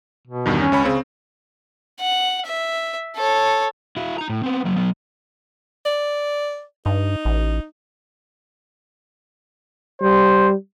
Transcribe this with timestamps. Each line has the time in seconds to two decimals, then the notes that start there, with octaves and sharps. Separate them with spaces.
0.27 B2
0.46 E2 G2 D#3
0.60 C#4
0.72 C#2 C#5 B5
0.85 C#3 C4
2.00 F#5
2.46 E5
3.17 A4 C#5
3.96 E4 F#4
4.18 D#4 A#5
4.29 A2
4.43 B3 C4
4.65 F#3 A#3
4.76 F#3 B3
5.86 D5
6.86 G2 D#4
7.25 A1
10.02 G3 C5